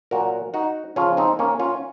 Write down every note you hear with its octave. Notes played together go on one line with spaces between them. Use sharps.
A#2 F#3 F#4 A#4
D#4 F#4
C#3 F3 C#4 F4
C4 D#4
A#3 C#4
C#4 F4